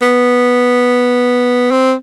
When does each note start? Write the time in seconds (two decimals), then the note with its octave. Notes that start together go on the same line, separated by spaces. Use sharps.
0.01 B3
1.71 C4